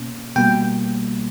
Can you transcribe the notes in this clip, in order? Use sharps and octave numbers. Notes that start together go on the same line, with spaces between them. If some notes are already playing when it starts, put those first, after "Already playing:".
Already playing: B2 A#3 C#4
B2 G3 A#3 G5